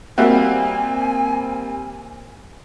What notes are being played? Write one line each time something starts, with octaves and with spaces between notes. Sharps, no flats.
G3 A#3 C4 F#4 E5 F#5 G#5